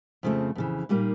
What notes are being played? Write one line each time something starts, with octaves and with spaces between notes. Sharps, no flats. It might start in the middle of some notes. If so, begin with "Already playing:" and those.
F2 C#3 F3 A3 C4
F2 C#3 E3
A#2 G3 A#3 D#4